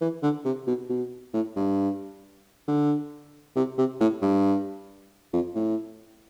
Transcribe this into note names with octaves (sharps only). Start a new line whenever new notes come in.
E3
D3
C3
B2
B2
A2
G2
D3
C3
C3
A2
G2
F2
A2